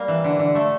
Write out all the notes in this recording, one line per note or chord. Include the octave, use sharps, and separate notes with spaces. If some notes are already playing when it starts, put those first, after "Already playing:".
Already playing: G3 A#3
E3
D3
D3
A3